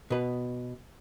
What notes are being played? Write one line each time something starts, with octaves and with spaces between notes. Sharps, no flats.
B2 B4